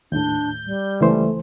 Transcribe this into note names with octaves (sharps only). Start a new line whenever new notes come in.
D#2 A2 D4 G6
G3
C#2 E3 A3 C5